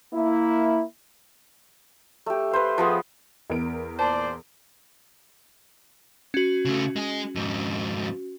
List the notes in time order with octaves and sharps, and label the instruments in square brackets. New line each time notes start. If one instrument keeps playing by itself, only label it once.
[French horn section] A#3 E4
[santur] A3 G4
B4 C5 F5
F3 B3 G#4
[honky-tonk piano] E2 A#4 D7
[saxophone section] A#2 C5 [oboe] D5 [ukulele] A5
[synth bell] C#4 F#4
[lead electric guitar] C#3 A3
G#3 G#4
F2 G#2